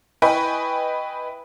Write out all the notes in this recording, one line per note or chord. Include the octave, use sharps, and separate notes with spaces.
E4 B4 D#5 G5 G#5 C#6